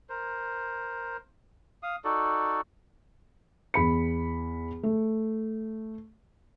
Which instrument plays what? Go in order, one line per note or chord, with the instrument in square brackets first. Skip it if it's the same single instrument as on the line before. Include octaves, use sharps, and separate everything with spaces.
[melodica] A#4 C5
F5 D#6
D#4 F#4 A4 D5
[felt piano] E2 B5 C#7
A3